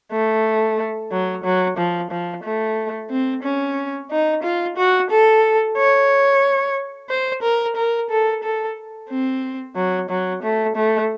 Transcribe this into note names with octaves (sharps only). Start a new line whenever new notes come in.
A3
F#3
F#3
F3
F3
A3
C4
C#4
D#4
F4
F#4
A4
C#5
C5
A#4
A#4
A4
A4
C4
F#3
F#3
A3
A3